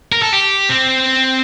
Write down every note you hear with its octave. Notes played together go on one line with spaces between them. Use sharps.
A#4
A4
G4
C4